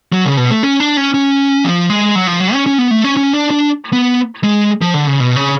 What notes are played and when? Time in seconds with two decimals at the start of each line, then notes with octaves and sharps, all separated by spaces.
0.12 F#3
0.25 C#3
0.37 B2
0.51 A3
0.63 C#4
0.80 D4
0.97 C#4
1.14 C#4
1.64 F3
1.90 G#3
2.15 F#3
2.27 F3
2.41 F#3
2.53 C#4
2.66 C#4
2.78 B3
2.91 A3
3.04 C#4
3.17 C#4
3.34 D4
3.51 D4
3.93 B3
4.44 G#3
4.82 F3
4.94 D3
5.07 C#3
5.20 B2
5.36 C#3